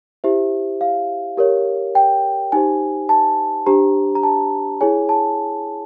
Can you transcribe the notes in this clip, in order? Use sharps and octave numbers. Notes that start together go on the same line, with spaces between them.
E4 G4 C5 E5
F5
G4 A#4 C#5
G5
D#4 G4 C5 G#5
A5
D4 G4 C5 A#5
A#5
A5
E4 G#4 C#5 G#5
A5